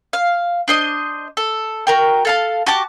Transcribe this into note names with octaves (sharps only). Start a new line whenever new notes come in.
F5
D4 C5 D#5
A4
F#4 A#4 G5
A4 F5 A5
F#4 G4 A5 D6